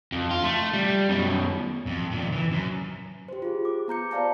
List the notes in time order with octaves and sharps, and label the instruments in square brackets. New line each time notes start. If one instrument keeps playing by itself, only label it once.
[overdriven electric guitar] F2
F4
A3
G3
F#2 B2
[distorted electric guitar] F2
A#2 D#3
E3
F#2
[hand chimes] G4 C5
F4 G#4
D6
B3 A#5 G6 C#7
C5 D5 F5 A5 A#5